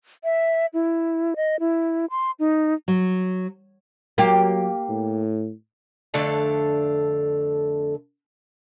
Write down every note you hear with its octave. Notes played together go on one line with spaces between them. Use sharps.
E5
E4
D#5
E4
C6
D#4
F#3
F#3 A#3 G4
A2
F2 D3 A3 D4 A4 F5